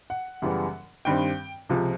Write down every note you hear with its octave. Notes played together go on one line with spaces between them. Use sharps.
F#5
F#2 C#3 E3 G3 B3
G2 D#3 G3 C4 G5
C#2 C3 F3